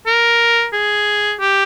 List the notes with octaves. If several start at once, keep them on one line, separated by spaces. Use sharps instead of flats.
A#4
G#4
G4